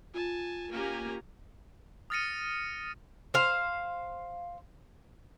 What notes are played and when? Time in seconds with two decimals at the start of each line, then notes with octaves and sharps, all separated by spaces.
0.14 F4 G#5 A5
0.71 A#3 C#4 G4 G#5 A#5
2.10 D#6 F6 A6 A#6 C#7 D#7
3.34 C5 F5